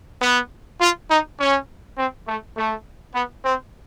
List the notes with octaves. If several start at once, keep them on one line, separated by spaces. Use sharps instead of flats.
B3
F4
D#4
C#4
C4
A3
A3
B3
C4